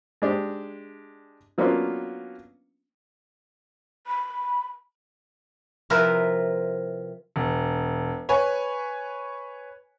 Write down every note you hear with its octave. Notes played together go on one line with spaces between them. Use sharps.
G#3 D4 G4
F#3 A#3 B3 C#4 D4 F4
B5
C3 F3 E4 A#4 B4
E1
B4 C#5 G#5 B5